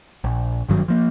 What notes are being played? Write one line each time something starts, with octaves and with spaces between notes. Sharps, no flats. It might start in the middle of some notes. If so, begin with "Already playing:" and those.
A#1
G#1 G2 D#3 F#3
F3 A#3